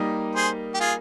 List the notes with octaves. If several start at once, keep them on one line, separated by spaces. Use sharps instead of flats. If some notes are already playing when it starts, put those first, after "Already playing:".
Already playing: G3 A#3 D#4
G#4 C5
G4
F4 G#4